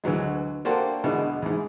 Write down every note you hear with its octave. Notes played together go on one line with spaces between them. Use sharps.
D2 E3 F#3 G#3
A#3 D4 F#4 G4 A4 C5
E2 B2 D3 E3 G#3
E2 G#2